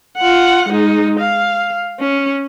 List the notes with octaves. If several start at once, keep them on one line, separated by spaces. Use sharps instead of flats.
F4 F#5
G#3 D#4
F5
C#4